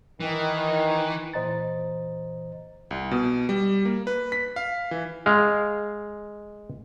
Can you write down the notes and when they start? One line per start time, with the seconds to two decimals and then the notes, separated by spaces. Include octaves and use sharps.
0.20 D#3 E3
1.33 A#2 E3 C5 D#5 A#5 A6
2.91 C2
3.11 B2
3.49 G3
3.85 A#3
4.07 B4
4.32 B6
4.56 F5
4.91 E3
5.26 G#3 F5